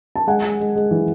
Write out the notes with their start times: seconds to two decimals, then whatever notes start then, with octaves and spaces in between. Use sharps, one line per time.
0.16 A5
0.27 G#3 F#5 G#5
0.44 G#3
0.60 G#3
0.76 G#3
0.91 E3